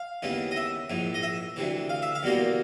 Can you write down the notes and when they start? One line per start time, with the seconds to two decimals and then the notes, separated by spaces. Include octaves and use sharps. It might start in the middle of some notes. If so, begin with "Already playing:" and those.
Already playing: F5
0.22 D#2 C#3 E3 G#3 B3
0.51 D#5
0.56 E5
0.90 A#1 G#2 E3
1.14 D#5
1.23 E5
1.56 D2 C3 E3
1.89 F5
2.02 E5
2.15 F5
2.23 E2 B2 G3 A#3